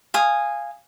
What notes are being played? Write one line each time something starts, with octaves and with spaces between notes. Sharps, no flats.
F5 G#5 D#6